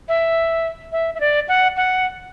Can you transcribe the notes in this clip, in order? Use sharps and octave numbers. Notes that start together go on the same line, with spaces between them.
E5
E5
E5
D5
F#5
F#5